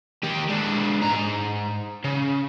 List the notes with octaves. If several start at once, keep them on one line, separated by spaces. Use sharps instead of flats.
D#3 G4
G#3 D4
G#2 A#5
C#3